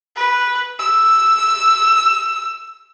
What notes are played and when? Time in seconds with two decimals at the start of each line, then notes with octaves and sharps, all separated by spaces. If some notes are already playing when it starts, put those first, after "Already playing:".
0.16 B4
0.79 E6